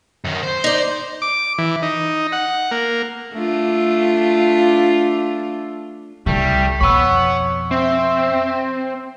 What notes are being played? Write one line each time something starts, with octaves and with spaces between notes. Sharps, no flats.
F#2 D#3
C5
D#4 D5
D6
E3
D#4
F#5
A#3
A3 D4 F4
C2 C3 G3 A3
F2 B2 C#5 F#5 B5 C#6 E6
C4 E5